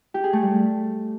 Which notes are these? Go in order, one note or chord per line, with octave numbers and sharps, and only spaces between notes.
G4
G#4
A3
G3